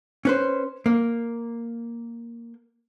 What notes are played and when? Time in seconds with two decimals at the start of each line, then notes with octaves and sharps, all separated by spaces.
0.25 C#4 B4 C5
0.86 A#3